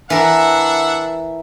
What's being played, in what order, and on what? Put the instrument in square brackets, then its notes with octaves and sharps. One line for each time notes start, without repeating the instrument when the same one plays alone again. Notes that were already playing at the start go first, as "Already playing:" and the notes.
[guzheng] E3 A#4 [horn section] D4 E5 F#5